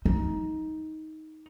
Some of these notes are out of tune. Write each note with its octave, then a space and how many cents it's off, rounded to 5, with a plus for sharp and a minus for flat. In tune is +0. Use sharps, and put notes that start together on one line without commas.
D#4 +10